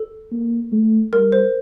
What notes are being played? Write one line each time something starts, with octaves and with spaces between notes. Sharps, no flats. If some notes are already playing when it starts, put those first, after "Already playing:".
Already playing: A4
A#3
A3
G3 A#4
C5